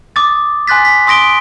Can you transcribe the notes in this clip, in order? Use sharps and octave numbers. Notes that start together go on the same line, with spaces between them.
D6 D#6 A6
G#5 C6 F#6 A6 B6
B6
C6 D#6 A#6 D7 G7